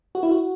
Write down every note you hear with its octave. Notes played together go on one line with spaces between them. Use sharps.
F#4
E4
F#4